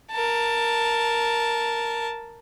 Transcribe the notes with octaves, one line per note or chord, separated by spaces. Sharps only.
A#4 A5